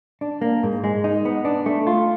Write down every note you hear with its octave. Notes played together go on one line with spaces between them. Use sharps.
D4
A#3
G#2
G#3
D#4
B3
D4
A3
F4